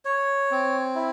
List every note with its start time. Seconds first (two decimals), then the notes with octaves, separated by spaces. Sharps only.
0.05 C#5
0.51 C4
0.95 E4